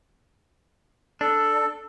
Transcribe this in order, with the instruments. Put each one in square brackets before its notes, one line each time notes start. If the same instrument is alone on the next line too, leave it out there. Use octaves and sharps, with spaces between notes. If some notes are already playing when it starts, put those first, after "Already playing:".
[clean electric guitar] D4 [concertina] A4